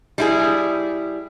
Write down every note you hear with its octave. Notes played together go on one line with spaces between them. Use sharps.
G3 E4 G#4